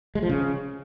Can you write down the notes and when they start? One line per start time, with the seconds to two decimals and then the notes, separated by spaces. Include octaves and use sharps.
0.15 G#3
0.22 F3
0.29 C#3